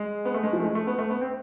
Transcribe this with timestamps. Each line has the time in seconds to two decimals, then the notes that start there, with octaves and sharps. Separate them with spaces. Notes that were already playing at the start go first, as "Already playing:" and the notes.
Already playing: G#3
0.25 B3
0.34 A3
0.43 G#3
0.53 F3
0.60 A3
0.64 G#3
0.75 A3
0.87 B3
0.98 A3
1.10 B3
1.21 C4